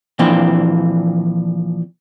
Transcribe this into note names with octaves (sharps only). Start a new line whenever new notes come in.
A#2 E3 F3 C4 D4